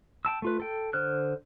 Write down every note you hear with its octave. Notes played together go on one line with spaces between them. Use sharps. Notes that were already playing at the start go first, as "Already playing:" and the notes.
G5 A5 E6
A3 F4 B4
A4 G5
D3 C5 F6 F#6